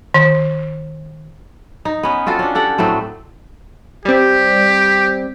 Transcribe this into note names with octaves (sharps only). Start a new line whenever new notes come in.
D#3
D#4
B3 C#4
C4 F4 F#4 A4
C#4 D4
G4 A4 F#5
A2 F#3 A3 C4
G3 C4 G4